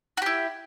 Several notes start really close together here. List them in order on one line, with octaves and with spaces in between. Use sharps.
F#4 G4 E4